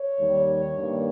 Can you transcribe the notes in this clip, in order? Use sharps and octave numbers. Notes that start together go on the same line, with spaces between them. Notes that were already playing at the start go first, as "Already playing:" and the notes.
Already playing: C#5
D#2 D#3 G3
G2 D#3 A#3